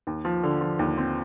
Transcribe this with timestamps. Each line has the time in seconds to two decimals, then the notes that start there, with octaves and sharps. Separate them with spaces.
0.07 D#2
0.25 F3
0.43 D3
0.61 F3
0.79 D#2
0.97 C4